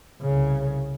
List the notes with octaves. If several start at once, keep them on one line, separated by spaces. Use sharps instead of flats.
C2 C#3